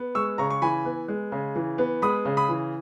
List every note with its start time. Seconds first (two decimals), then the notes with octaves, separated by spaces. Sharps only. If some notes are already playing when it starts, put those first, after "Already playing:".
Already playing: B3
0.15 G#3 C#6 E6
0.38 C#3 A#5 C#6
0.50 C#6
0.62 E3 G#5 B5
0.85 B3
1.08 G#3
1.32 C#3
1.56 E3
1.78 B3
2.02 G#3 B5 D#6
2.25 C#3
2.37 B5 D#6
2.49 E3